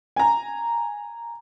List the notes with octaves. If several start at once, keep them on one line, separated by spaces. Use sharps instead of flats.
G#5 A#5